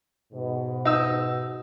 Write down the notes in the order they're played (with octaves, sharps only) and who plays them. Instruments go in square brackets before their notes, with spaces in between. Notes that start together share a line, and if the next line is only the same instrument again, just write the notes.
[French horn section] G#2 B2
[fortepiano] D#4 E6